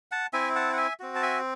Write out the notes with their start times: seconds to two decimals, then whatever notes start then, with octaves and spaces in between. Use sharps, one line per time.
0.11 F#5 A5
0.33 C4 E4 E5 G#5
0.55 F#5 A5
0.73 F#5
0.77 E5 G#5
1.00 C4 F#4
1.15 A5
1.22 E5 G#5